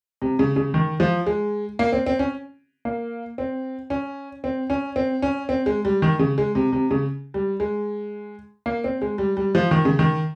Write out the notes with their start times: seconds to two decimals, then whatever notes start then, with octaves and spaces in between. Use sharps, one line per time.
0.22 C3
0.39 C#3
0.56 C#3
0.74 D#3
1.00 F3
1.26 G#3
1.79 A#3
1.92 C4
2.06 C4
2.19 C#4
2.85 A#3
3.38 C4
3.90 C#4
4.44 C4
4.70 C#4
4.96 C4
5.22 C#4
5.49 C4
5.66 G#3
5.85 G3
6.02 D#3
6.19 C#3
6.38 G#3
6.55 C3
6.72 C3
6.91 C#3
7.34 G3
7.60 G#3
8.66 A#3
8.84 C4
9.02 G#3
9.18 G3
9.37 G3
9.55 F3
9.71 D#3
9.85 C#3
9.99 D#3